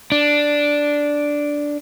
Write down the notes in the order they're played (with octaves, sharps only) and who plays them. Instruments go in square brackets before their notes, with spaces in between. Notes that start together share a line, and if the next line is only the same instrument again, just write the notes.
[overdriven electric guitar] D4